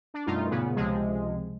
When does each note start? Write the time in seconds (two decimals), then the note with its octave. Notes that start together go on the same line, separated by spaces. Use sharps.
0.14 D4
0.26 F#2 B2 G3 A3 D#4 F4
0.50 A#2 C#3 B3
0.76 C#2 C3 F3 G#3